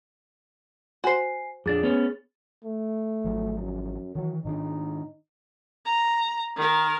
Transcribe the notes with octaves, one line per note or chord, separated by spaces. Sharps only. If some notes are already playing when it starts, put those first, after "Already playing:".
F#4 C5 G#5 C7
F2 D4 G#4 A6
B3 C#4
A3
G#1 F3 F#3
F#2
D#3 E3 F#3
G#2 D#3 D4 D#4
A#5
D#3 A#4